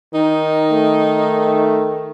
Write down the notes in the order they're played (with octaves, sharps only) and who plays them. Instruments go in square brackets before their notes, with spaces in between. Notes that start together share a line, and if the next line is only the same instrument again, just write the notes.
[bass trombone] D#3 [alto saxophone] D#4
[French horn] A3